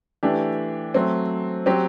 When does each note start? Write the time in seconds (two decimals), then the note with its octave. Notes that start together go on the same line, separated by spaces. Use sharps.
0.23 E3 A3 D4 G4
0.94 F#3 A3 C4
1.66 F#3 C4 G4